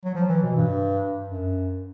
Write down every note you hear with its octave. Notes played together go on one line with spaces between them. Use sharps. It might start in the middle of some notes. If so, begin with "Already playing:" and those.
F#3
F3
E3
B2
G2
F#2